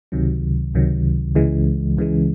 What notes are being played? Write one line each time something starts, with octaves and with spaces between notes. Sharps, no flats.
C#2 C3 D#3 F#3
C#2 C3 D#3 F#3
C#2 C#3 E3 G#3
C#2 C#3 E3 G#3